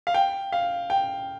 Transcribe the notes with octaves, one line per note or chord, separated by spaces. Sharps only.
F5
G5
F5
G5